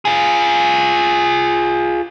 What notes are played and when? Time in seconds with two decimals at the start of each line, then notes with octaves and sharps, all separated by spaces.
0.05 F4 G#4